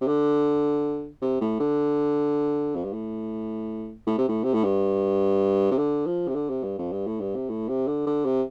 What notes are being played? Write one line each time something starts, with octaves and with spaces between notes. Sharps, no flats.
C3
D3
C3
A2
D3
F2
G2
A2
A2
C3
A2
C3
A2
G2
C3
D3
F3
C3
D3
C3
G2
F2
G2
A2
G2
C3
A2
C3
D3
D3
C3